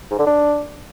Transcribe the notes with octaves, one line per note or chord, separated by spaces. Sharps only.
G#2
D3
D4